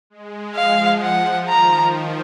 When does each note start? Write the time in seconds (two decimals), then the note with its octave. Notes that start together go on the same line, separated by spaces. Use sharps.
0.10 G#3
0.56 F3 F5
1.03 F3 F#5
1.49 D#3 A#5